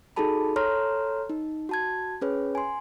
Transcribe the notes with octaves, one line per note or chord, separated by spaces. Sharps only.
D#4 F#4 G#4 A4 A5 B5
A4 C#5 A#5 C6 F6
D#4
F#4 A5 G#6
C#4 G#4 B4 C#5
G#5 C6